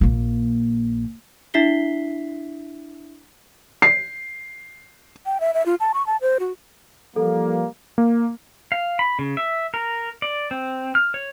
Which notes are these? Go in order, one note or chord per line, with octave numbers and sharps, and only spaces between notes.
A#1 A#3
D4 E4 E5 B6 C7 G7
C7
G5
E5
E5
F4
A5
C#6
A5
C5
F#4
F3 G3 A#3 A4
A#3
F5
B5
C#3
E5
A#4
D5
C4
F6
C#5